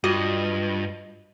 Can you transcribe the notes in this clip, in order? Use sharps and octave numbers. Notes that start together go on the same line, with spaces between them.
G2 F4 F#4 D#5